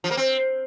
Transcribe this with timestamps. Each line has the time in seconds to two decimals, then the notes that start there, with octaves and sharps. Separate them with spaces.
0.04 F3
0.11 A#3
0.17 C4